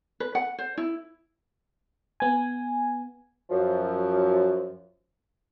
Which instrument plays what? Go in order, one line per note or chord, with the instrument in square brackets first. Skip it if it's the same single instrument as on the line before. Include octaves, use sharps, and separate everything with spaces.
[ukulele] B4
F#5
C5
E4
[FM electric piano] B3 G#5
[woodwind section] F#2 F3